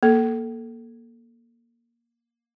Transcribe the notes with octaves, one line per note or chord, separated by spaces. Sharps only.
A#3 A4